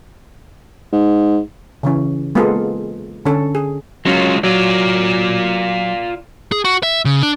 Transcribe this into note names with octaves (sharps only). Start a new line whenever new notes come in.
G#2
C#3 E3 C#4
G#3 A#3 B3 F4 G#4 A4
D3 C#4 A4
G#4
F#3 G#3 C#4 F4
F#3 F4 D5
G#4
F#4
E5
C#3
D4